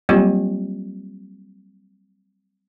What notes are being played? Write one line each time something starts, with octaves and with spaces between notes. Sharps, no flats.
F#3 G3 A#3 C4 F4 G4